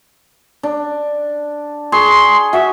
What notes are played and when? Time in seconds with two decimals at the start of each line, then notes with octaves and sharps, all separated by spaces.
0.63 D4
1.92 G#4 C6 C#6
2.53 F#4 E5